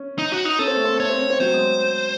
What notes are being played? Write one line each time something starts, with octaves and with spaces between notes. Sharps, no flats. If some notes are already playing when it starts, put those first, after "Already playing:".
Already playing: C#4
D#4
F#4
D#4
C#4 A4
C4
A3
C4
A3 C#5
C4
C#4
C4
F#3 C5
G#3